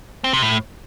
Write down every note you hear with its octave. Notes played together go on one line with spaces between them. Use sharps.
C4
C3
A2